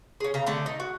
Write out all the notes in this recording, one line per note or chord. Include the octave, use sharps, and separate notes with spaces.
C#4 G#4
C#3 A#5
D3 A3 A4
D#4
F#4